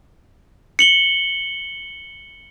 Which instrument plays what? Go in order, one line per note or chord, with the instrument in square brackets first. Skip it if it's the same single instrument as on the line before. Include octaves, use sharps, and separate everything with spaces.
[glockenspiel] C#7 F#7 G7